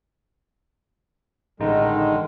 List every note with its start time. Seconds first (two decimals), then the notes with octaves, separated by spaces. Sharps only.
1.60 A1 D3 D#3 G#3 D#4